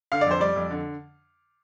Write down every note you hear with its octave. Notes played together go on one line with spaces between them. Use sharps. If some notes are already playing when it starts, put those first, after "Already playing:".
D3 F5
D5
F2 C5
G3 D5
F2
D3